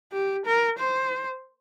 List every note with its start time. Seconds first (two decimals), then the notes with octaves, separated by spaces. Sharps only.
0.12 G4
0.46 A#4
0.79 C5